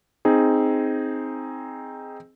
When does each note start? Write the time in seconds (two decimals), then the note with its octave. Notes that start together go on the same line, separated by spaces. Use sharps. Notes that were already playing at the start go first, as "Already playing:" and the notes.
0.25 C4 D#4 G#4